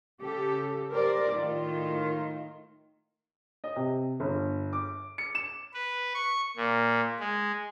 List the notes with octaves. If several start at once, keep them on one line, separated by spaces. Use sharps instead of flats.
C#3 G4 A4
G4 A#4 C5 D5
A2 D#3 F4
D#5
C3
G1
D6
C#7
E7
B4
C#6
A#2
G#3